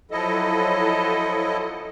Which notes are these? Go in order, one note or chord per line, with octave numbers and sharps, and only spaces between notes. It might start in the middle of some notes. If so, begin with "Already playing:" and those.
F3 F#3 E4 A4 D#5